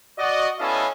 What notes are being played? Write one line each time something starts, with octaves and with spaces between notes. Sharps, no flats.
F#4 D5 D#5
B3 C#4 E4 A4 D#5 F5